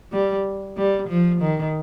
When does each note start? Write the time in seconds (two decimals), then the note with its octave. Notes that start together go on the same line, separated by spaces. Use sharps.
0.12 G3
0.77 G3
1.09 F3
1.41 D#3